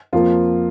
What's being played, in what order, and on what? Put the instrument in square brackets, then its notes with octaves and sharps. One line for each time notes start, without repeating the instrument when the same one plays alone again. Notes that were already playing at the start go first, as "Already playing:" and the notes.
[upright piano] F2 F3 A#3 F4